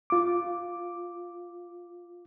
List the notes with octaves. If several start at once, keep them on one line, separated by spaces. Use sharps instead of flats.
F4 D6